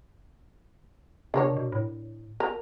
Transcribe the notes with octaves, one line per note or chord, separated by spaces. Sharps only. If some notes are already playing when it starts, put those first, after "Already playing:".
C3 D4 A#4 C#5
B2
A2
A#4